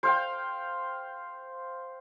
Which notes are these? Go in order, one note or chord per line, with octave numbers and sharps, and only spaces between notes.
C5 F5 G5